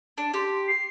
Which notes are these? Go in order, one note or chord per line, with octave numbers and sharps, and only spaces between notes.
D4
G4 C6
C7